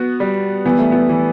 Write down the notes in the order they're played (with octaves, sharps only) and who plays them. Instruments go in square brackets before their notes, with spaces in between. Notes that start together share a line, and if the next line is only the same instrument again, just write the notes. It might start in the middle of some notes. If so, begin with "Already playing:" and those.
Already playing: [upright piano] B3 [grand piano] F#4
[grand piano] G3
[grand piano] E3 [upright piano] B3
[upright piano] A3
B3
[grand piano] E3